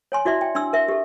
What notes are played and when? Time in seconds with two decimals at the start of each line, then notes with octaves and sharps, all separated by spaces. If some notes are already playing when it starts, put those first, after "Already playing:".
0.12 C#5 G#5 C6
0.25 E4 F#4 D5 E5 C6
0.41 G5
0.55 D4 C6 E6
0.73 A#4 E5
0.89 G4 A4